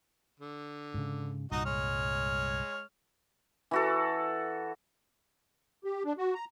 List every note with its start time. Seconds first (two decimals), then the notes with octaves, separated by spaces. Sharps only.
0.40 D3
0.94 G#2 C#3
1.52 C2 G2 A#2 D#4 F#4 D#5
1.65 G#3 C#5 F6
3.71 E3 F#4 A4
5.84 G4
6.05 D4
6.18 F#4
6.35 A#5